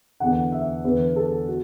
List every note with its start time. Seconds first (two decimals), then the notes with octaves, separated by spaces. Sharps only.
0.20 E2 D3 F#5
0.52 E5
0.84 E2 D3 B4
1.16 A4
1.48 F#4